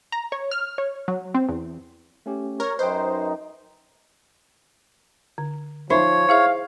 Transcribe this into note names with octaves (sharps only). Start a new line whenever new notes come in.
A#5
C#5
F6
C#5
F#3
C4
E2
A3 C#4 G4
A#4 C#5
F#2 D#4 B4 C5 G5
D3
F3 D#4 C5 C#5 E5
E4 G#4 E5 F5